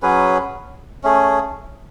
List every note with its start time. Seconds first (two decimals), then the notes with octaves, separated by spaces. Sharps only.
0.02 F#3 C#4 G#4 B4
1.04 A3 C#4 G#4